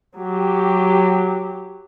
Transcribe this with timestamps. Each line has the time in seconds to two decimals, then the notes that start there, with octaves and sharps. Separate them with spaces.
0.16 F#3 G4